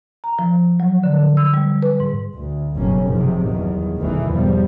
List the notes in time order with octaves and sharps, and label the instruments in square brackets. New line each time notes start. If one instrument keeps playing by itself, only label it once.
[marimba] A#5
F3
F#3
D3
E6
G3
B4
G#2
[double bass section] D2
F#1 G2 B2 A#3 C#4
G#2 C3 D#3 F3
E2 G2 D#3 F#3
F#1 D2 G#2 B2 D#3 E3
E2 F3 G3